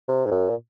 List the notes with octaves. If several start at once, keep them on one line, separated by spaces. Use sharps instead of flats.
C3
G#2
F#2
A#2